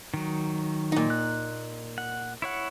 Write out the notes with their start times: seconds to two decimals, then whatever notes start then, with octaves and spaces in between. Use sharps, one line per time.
0.14 D#3 F#3
0.92 A#2 D#4
1.10 F#6
1.98 F#5
2.42 E4 C#5 F#5